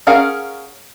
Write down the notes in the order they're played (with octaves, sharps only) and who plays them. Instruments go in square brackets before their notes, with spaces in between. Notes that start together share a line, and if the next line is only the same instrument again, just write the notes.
[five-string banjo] C#4 G#4 A#4 F5 F#5